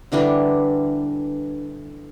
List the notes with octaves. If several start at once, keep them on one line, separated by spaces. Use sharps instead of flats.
D3 E3 G3 D4